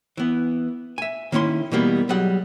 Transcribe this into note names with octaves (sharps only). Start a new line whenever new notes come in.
E3 B3
E5 G#5
D#3 A#3 C#4 E4 C6
B2 E3 G3 A#3 B3
F#3 G3 G#4 D#5 F#5